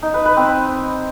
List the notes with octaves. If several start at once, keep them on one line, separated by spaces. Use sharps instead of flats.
D#4
B4
B4
C4